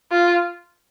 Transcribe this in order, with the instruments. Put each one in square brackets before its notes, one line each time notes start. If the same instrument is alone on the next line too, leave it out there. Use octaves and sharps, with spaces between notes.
[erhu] F4